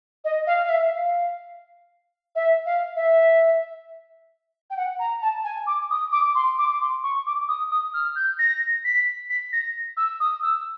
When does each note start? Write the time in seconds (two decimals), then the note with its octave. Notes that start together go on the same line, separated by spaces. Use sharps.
0.24 D#5
0.47 F5
0.64 F5
0.69 E5
0.92 F5
2.35 E5
2.66 F5
2.96 E5
4.70 G5
4.77 F#5
4.99 A#5
5.22 A5
5.44 G#5
5.67 D6
5.90 D#6
6.12 D6
6.35 C6
6.58 D6
6.81 C6
7.03 C#6
7.26 D6
7.48 D#6
7.72 D#6
7.94 F6
8.16 G6
8.39 A#6
8.84 B6
9.30 B6
9.53 A#6
9.97 E6
10.20 D#6
10.43 E6